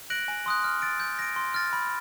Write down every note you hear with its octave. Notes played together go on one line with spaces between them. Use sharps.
F#6 A#6 D7 F#7
G#5
C6 D#6 F#6
F6
A6 D7
G6
A#6 D7
C6
F6 A6
B5